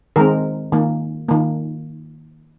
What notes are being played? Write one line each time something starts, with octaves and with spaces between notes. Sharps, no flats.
D#3 G#3 C4 A#4
D#3 A#3
D#3 A#3